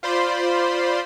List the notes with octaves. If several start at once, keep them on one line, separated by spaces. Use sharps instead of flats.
F4 C5 D5 B5 C6